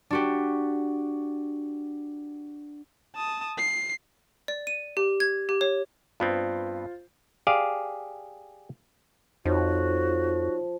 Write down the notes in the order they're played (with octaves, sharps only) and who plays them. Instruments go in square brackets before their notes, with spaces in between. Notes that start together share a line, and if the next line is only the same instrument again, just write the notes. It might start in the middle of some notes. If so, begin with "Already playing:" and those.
[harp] D4 F#4 G4
[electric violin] A5 D#6
C7
[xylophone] D5
D#7
G4
G#6
G4
C#5
[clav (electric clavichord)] G2 B3 C4 [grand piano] F4 C5
[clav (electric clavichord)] G4 G#4 D5 F5
[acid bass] F2 [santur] F3 [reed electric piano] D#4 F4 C#5 [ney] F#4